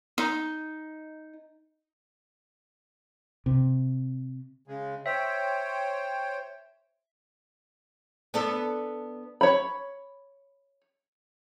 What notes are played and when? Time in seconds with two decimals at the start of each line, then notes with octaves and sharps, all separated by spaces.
0.18 D#4
3.46 C3
4.68 C#3 G#3
5.06 C5 C#5 E5 G5
8.34 B3 D4 A4
9.41 C#5 B5